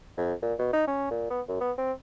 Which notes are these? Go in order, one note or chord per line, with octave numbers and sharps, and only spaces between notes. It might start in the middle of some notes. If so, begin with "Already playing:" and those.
F2
A#2
B2
D#4
C#4
A#2
B3
F#2
B3
C4